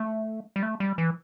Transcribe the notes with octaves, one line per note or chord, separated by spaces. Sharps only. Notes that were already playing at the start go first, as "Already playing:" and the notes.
Already playing: A3
G3
A3
G3
E3